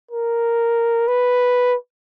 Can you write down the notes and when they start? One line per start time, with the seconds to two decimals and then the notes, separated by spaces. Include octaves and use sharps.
0.11 A#4
1.08 B4